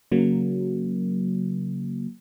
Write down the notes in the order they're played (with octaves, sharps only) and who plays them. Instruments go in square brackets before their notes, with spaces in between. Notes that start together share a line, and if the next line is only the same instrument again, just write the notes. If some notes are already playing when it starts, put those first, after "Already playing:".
[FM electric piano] C#3 F#3 A#3